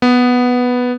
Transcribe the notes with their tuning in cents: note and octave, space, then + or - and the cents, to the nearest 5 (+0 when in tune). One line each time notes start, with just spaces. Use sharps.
B3 +0 B4 +0